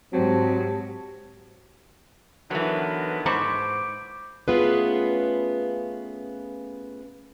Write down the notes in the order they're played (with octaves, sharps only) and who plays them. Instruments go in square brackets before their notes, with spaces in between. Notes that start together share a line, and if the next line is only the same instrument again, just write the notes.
[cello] G#2 [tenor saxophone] F#3 [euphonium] C4 [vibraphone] G4 A5
[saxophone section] D3 B3 D#4 [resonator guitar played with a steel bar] E3 F#3 [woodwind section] A#4
[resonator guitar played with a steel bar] G#2 [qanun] C5 B5 C#6 [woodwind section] D6
[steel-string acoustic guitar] A3 B3 C#4 F4 G#4 B4